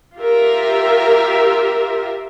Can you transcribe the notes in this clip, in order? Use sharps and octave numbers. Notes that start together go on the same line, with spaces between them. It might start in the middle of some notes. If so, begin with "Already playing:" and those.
F4 G4 A#4 E5